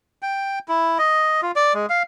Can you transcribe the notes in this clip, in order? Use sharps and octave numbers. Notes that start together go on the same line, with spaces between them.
G5
E4
D#5
F4
D5
G#3
F5